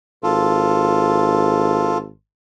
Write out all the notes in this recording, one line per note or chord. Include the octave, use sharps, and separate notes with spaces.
G#1 F4 A4